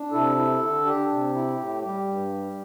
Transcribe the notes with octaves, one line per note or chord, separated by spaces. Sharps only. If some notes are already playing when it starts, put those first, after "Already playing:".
Already playing: D4
C3 E4 A4
E4
D3
D4 G4
C3
E4
A2
G3 G4
G2
G3